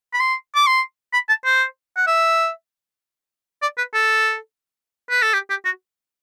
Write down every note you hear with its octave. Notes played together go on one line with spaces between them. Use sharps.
B5
C6
D6
C6
B5
A5
C5
F#5
E5
D5
B4
A4
B4
A4
G4
G4
F#4